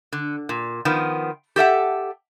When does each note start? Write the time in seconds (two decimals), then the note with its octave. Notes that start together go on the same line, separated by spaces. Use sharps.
0.13 D3
0.49 A#2
0.85 D#3 F3 B3
1.56 G4 A4 E5 F#5